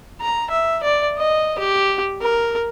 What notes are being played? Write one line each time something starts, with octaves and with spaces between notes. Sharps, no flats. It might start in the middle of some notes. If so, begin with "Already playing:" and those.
A#5
E5
D5
D#5
G4
A#4